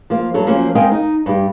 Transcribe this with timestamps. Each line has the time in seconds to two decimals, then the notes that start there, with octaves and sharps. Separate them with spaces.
0.10 F3 A#3
0.34 G2 F#3 A4
0.47 F3 F#3 A#3 C4 C#4
0.75 G#3 C4 A#4 D#5 F5 G5
0.92 D#4
1.26 G2 G4